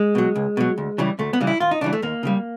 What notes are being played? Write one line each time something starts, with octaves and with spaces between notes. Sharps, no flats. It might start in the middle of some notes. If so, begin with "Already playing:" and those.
Already playing: G#3
B2 F#3
C#2
B2 F#3
D2
C#3 E3 G3
D2 A3
B3
C#3 E3 G3
E4
D#2 F4
D#4
C#3 E3 G3 D4
A3
D#2 A#3
C#3 E3 G3